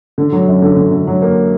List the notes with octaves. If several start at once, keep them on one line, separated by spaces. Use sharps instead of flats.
D3
F#3
F#2
D3
D3
D3
F#3
A#3